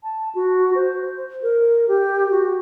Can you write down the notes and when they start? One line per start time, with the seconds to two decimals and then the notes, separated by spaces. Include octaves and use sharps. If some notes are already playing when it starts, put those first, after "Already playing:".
0.03 A5
0.35 F#4
0.75 C5
1.43 A#4
1.88 G4
2.31 F#4